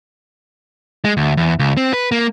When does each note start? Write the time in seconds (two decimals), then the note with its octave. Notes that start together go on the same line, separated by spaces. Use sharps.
1.05 G#3
1.17 D2
1.37 E2
1.59 C#2
1.77 C4
1.93 B4
2.12 A#3